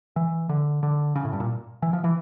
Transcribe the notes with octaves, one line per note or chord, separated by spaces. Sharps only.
E3
D3
D3
C#3
A2
G2
A#2
E3
F3
E3